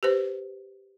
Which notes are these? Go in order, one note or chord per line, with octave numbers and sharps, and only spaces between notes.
G4 B4 C5